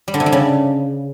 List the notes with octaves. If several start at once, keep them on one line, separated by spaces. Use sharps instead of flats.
G3
D3
C3
G3
C#3